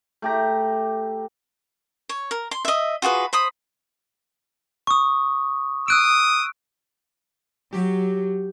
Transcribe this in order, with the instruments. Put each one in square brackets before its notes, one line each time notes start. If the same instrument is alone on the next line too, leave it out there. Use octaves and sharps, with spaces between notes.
[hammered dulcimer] A3 G4 A#5
[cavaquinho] C#5
A#4
C6
D#5 E5
F4 F#4 G#4 B4
C5 B5 D#6
[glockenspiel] C#6 D#6
[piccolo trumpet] D#6 [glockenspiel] E6 F#6 D7
[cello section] F#3 [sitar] G4